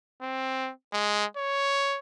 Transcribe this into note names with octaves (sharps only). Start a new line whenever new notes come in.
C4
G#3
C#5